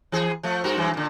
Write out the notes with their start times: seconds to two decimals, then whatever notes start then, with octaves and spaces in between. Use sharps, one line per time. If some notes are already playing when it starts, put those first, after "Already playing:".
0.12 E3 G#4
0.43 F3 A3
0.64 G2 F#4 A#4
0.77 G2 E3 F#3
0.94 A#2 D3